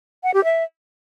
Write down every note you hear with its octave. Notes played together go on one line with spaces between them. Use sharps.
F#5
G4
E5